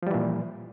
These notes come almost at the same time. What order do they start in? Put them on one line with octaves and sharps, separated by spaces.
F3 G3 E3 A#2